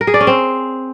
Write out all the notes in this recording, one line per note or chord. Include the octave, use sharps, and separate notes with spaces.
A#4
G#4
D5
C#4
C4